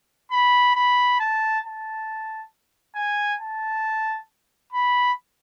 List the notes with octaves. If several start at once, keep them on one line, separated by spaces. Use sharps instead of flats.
B5
B5
A5
A5
G#5
A5
B5